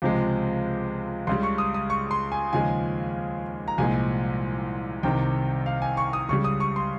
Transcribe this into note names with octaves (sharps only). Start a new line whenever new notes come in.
C#2 C3 F3 G#3
C#2 C#3 G3 C6
C#6
D#6
D#6
C#6
C6
G#5
D#2 C#3 F3 G#3 G#5
A#5
C2 A#2 F3 G#3 G#5
C2 C3 D#3 G5
F5
G#5
C#6
D#6
C#2 C#3 G3 C#6
D#6
C#6
C6